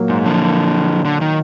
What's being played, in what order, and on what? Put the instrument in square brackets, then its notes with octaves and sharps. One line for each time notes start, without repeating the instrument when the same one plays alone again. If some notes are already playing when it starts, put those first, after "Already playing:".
Already playing: [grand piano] A#2 F#3 A#3
[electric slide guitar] G#2
D3 F3
D3
D#3